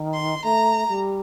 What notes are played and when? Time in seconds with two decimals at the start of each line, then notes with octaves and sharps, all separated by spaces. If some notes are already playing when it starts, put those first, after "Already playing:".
Already playing: D#3
0.13 C6
0.43 A3 A#5
0.89 G3